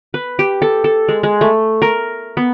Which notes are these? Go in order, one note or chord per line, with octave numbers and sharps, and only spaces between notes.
B4
G4
A4
A4
G#3
G#3
A3
A#4
B3